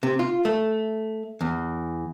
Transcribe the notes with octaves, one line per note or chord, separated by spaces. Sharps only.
C3
F4
A3
E2